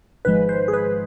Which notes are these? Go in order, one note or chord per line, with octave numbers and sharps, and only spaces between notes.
G#1 G#2 F3 G#3 B4
C5
G#4
B4